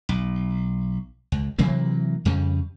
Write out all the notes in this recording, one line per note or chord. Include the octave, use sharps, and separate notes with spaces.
B1
C#2
C3 E3 F#3 A#3
F2 C#3 G3